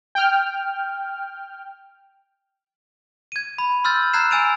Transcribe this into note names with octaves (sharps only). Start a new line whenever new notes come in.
G5 F6
G#6 D#7
B5
C6 E6 F6 G6 A6
A#5 E6 F#6 G#6 C7 E7
G#5 E6 A6 D7 D#7 F7